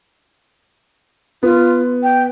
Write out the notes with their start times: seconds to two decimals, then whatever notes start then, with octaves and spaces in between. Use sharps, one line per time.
1.43 B3 F4
2.03 G5